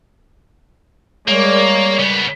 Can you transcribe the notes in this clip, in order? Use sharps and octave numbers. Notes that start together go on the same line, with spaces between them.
G3 G#3 A#3 A#4 C#5 D5
C#3 B3